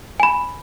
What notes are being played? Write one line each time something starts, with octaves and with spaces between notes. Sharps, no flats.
G#5 B5